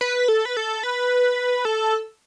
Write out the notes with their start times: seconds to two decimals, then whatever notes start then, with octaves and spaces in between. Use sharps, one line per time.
0.01 B4
0.28 A4
0.45 B4
0.57 A4
0.83 B4
1.65 A4